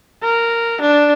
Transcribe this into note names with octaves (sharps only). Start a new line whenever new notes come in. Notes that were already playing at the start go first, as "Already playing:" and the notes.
A#4
D4